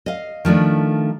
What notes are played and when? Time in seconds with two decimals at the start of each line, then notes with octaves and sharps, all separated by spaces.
0.06 D#5 F5
0.45 D#3 F3 A3 D4